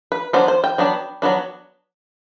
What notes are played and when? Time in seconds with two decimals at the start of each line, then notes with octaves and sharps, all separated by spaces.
0.12 B4
0.33 F#3 B3 D4 C5
0.48 C5
0.64 G5
0.78 F#3 B3 D4
1.22 F#3 B3 D4